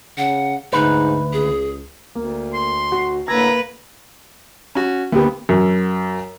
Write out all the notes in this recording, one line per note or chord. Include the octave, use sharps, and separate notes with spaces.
C#3 F#5
D2 G#2 B2 D#4 B4
C#2 G#4
D2 A#3
C6
F#4
A2 D3 A#3 B4 E5 A#5 G#6
C#4 F#4
D2 A#3 B3 G4
F#2